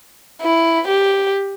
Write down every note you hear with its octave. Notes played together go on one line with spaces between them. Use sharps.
E4
G4